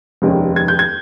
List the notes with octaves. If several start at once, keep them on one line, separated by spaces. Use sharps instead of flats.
F1 D#2 D#3 G#3 C#4
G#6
G6
G#6